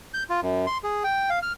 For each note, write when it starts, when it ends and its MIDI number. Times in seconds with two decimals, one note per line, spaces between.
0.14 0.23 91
0.30 0.40 65
0.42 0.66 42
0.67 0.78 84
0.84 1.03 68
1.04 1.30 79
1.30 1.39 77
1.42 1.53 89